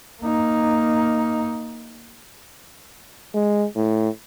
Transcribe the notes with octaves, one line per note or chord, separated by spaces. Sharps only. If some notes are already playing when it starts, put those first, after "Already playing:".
A#3 D#4
G#3
A2